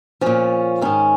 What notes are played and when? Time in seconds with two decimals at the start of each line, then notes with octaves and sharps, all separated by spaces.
0.21 A#2 F3 C#4
0.81 G#2 D#3 C#4